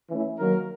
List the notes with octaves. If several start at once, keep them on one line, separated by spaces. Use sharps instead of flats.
E3 A3 C#4 E4
D#3 F#3 A#3 A#4